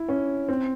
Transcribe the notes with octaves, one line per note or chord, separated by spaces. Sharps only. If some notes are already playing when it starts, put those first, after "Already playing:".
Already playing: E4
C#4
C4